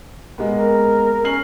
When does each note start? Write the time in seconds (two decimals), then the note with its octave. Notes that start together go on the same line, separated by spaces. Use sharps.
0.38 G#3 A#3 B3
0.54 A#4
1.25 C#4 F6 C7 F#7